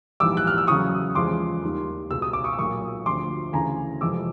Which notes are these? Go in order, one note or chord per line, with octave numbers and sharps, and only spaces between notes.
A#1 G#2 E3 G3 D6 E6
F#6
F6
E6
E2 C#3 F#3 C#6 D#6
E2 C#3 F3 G#3 C6 D6
D#2 D#3 G3
C#2 B2 G#3 E6
D#6
D6
C#6 D#6
E6
B1 A#2 F#3 C#6 D#6
D2 D3 F3 C6 D6
D2 C#3 E3 G#5 A#5
F2 C3 E3 G#3 D6 E6